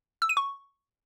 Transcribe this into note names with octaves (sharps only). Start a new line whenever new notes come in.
E6
D#7
C#6